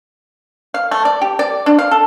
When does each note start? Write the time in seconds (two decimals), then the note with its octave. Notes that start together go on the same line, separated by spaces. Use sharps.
0.74 F5
0.91 A3
1.05 D5
1.21 G4
1.39 D5
1.66 D4
1.79 F5
1.91 A4